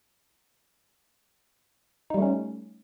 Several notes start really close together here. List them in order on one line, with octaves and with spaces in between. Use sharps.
D#4 G3 A3 C#4